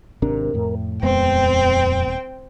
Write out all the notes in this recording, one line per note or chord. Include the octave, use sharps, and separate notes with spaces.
G#1 C3 D4 A#4
F2 A2
D#1 F2 G#3 B3 C4 G5